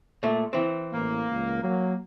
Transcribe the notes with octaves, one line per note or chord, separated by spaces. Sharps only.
A#2 A3
E3 C4
A1 A#3
C#2
F#3 A#3